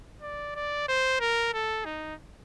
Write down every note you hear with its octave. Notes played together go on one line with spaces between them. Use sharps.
D5
D5
C5
A#4
A4
D#4